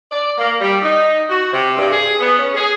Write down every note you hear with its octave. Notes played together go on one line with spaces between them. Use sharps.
D5
A#3
G3
D#4
F#4
C3
G2
G#4
B3
C#4
G#4